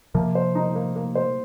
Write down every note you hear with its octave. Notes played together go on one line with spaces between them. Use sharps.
C3 F3 A#3
C5
D#4
A#3
A#3
C5